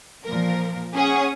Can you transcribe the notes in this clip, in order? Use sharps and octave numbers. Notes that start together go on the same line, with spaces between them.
A#2 F3 A#4
C#4 G#4 F#5 C#6 D#6